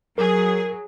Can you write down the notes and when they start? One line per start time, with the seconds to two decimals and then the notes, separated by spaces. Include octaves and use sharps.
0.18 F#3 G#4 A#4